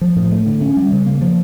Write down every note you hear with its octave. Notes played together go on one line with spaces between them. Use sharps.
F3
A2
A3
D3
C#4
G3
C#3
A#3
F3